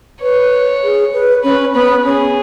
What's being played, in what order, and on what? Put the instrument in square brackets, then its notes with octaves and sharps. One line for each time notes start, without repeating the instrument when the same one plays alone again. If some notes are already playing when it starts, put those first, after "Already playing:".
[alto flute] B4 [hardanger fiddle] C#5
[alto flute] G#4
B4
[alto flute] C#4 [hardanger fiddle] B4
[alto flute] B3 [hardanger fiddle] B4
[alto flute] C#4 [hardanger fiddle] G#4